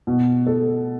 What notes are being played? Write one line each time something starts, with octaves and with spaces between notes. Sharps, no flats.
B2
A4